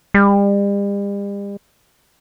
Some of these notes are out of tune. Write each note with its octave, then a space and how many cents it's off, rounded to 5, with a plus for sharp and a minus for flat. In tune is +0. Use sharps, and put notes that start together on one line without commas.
G3 +40